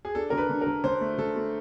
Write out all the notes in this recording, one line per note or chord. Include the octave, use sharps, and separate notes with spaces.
G#4
D4 A4
D3 A#4
B4
D3
A#4
D3
D3 C5
A3
D3 A4
A3